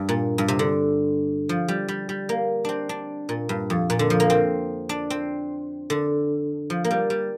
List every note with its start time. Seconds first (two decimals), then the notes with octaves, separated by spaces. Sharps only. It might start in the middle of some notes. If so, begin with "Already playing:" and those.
Already playing: G2
0.09 A#2
0.38 G2
0.48 C3
0.59 D3
1.49 F3
1.68 G3
1.88 G3
2.09 G3
2.29 A#3
2.65 C4 D4
2.89 D4
3.29 A#2
3.49 G2
3.70 F2
3.90 A#2
3.99 D3
4.10 F3
4.20 A#3
4.30 C4
4.89 D4
5.10 C4
5.90 D3
6.70 F3
6.84 A#3
6.91 G3
7.10 G3